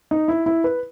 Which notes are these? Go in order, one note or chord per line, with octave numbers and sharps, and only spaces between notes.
D#4
E4
E4
B4